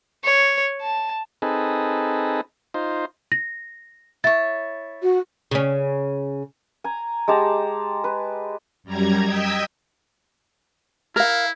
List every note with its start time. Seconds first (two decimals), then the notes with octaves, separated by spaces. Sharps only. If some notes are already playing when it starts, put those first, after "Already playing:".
0.24 C#5
0.82 A5
1.42 C4 D#4 G#4 A4 B4
2.74 D#4 F4 C5
3.32 A#6
4.24 E4 C#5 A6
5.02 F#4
5.51 C#3 C#4
6.84 G#5 A#5
7.28 G#3 G4 A5 A#5
8.04 B4
8.84 F#2 G3 A#5 G#6
9.25 D#5 G5 D#6 E6 G#6 B6
11.16 E4 A#4 F5